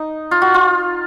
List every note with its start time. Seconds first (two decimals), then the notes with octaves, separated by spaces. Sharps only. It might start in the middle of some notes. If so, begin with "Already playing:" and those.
Already playing: D#4
0.31 F4
0.42 F#4
0.54 F4